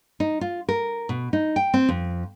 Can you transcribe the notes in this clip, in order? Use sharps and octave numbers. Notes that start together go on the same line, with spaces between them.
D#4
F4
A#4
B2
D#4
G5
C4
F2